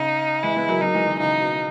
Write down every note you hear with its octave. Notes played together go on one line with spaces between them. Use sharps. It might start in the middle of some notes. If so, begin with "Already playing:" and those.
Already playing: C#3 D#4
E3 G#3 E4
G#3 B3
F#3 A#3
F#3 A#3 D#4
E3 G#3
D#3 F#3
C#3 E3 D#4
B2